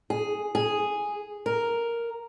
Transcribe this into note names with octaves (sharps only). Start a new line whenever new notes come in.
G#4
G#4
A#4